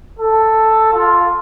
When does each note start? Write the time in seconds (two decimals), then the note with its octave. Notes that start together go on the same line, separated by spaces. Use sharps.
0.19 A4
0.93 F4